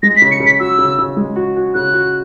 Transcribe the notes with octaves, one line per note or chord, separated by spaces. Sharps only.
G#3 A#6
B6
C#3
C#7
C#3
B6
F#4 E6
C#3
C#3
G#3
F#4
F#4
C#3 F#6
F#4